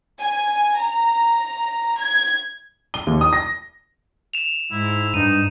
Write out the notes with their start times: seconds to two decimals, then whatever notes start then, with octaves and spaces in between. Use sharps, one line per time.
0.19 G#5
0.77 A#5
2.00 G#6
2.94 G7
3.07 D#2
3.21 D#6
3.33 A#6
4.34 E7 F7
4.72 G#2 E4
5.14 G2 D#4 D#7